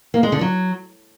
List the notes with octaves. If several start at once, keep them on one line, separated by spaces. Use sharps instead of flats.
A#3
G#3
D3
F#3